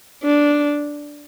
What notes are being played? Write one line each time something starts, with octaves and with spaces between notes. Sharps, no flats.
D4